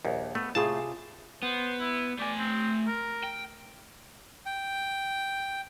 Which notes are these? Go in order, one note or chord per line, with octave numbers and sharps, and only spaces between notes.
A#1 D#2
A3 B3
A2 C3 F4 G#4 A5
B3 C5
E4
A3 D5 G#5
C4
A#4
G5
G5